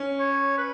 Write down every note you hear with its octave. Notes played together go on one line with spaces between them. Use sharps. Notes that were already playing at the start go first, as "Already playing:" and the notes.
Already playing: C#4
C#5
B4